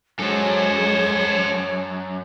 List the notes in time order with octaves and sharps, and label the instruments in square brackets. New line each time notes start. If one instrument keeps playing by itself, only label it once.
[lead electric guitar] F#2 [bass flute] G#3 [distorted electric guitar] A4 C5 [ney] C#5